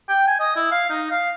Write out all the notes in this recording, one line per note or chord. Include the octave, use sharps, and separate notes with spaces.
G5
G#5
D#5
E4
F5
D#4
F5